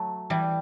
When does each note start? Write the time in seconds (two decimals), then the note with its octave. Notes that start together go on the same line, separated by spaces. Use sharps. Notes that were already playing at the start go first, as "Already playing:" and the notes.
Already playing: F#3 A3
0.30 E3 G3